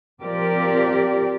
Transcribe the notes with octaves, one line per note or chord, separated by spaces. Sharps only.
F3 C4 G4 A#4 D5